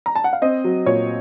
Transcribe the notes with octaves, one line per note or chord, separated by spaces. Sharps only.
A#5
A5
F#5
F5
C4 D#5
F#3
A#2 C#5